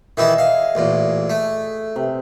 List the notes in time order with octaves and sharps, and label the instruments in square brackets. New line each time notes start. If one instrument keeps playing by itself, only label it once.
[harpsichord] D#3 E3 E4 [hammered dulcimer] G#4 D#5 E5
[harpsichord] F5
A1 A#2
A3
[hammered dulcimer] C3